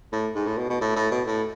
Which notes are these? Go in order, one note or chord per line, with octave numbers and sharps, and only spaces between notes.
A2
G#2
A2
B2
B2
A2
A2
B2
A2